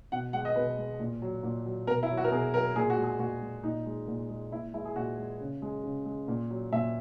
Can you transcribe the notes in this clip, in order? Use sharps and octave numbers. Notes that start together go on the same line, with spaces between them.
B2 F#5
G#3 F#5
D#5
B2 B4
G#3
A#2
F#3
A#2
F#3
B2 A#4
E4
F#3
F#4
A#4
B2 G#4
F#3 A#4
A#2 G#4
F#4
G#3
G#4
A#2 F#4
G#3
A#2 D#4
G#3
A#2
G#3
A#2 E4
G#3 E4
G#4
A#2 F#4
G#3
C#3
G#3
C#3
G#3
A#2
F#3
A#2 E5